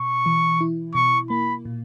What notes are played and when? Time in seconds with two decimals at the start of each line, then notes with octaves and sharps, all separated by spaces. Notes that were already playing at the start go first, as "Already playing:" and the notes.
Already playing: B2 C#6
0.26 E3
0.61 E4
0.95 B2 C#6
1.30 A#3 B5
1.65 A#2